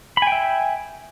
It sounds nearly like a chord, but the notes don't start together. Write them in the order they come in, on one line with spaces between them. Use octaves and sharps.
B5 G#5 G5 E5